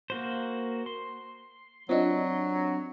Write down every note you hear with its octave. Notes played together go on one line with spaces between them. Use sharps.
A#3 F#4 C5
C6
F#3 C4 D4 F4 D#5